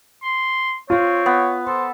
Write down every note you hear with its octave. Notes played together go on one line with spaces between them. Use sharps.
C6
C4 F4 C#5
B3
A4 C5